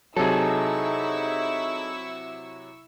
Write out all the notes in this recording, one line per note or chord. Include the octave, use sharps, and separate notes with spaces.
C3 F#3 D#4 E4 G#4 A4 C#6 E6